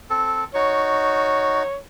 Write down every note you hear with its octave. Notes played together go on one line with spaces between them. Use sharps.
C4 A4
D#4 F#4 C#5